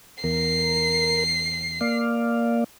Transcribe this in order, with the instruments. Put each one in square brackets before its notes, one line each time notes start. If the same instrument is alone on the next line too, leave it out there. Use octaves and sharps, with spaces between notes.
[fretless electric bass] E2 [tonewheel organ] A#4 [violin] C7
[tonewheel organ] A#3 D5 F5